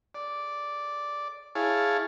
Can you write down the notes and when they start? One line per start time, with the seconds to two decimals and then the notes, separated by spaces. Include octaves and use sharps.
0.15 D5
1.55 E4 G#4 C#5 F5 A5